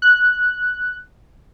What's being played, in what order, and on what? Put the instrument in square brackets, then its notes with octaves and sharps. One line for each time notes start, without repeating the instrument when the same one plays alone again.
[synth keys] F#6